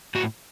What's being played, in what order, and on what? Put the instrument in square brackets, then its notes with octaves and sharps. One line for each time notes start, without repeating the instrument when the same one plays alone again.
[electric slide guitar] A2 F#4